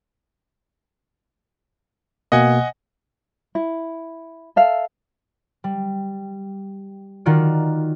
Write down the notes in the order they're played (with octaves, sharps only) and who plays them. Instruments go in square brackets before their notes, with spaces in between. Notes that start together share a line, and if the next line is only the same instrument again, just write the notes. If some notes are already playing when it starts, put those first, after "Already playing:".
[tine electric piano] B2 A#3 [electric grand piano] D#5 F#5 G#5
[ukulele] E4
A4 E5 F5
[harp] G3
D#3 F4 F#4 D5